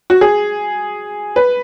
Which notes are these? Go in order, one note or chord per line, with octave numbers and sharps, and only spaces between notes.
F#4
G#4
B4